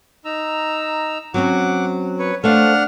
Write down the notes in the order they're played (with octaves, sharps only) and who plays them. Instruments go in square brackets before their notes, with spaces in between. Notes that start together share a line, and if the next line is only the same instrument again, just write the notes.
[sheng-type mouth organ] D#4 A#5 E6
[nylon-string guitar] F#3 C4 C#4 [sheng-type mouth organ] F#5 D6
[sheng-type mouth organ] B4 C#5
[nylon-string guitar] A3 C5 F5 [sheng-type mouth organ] D4 F#5 F6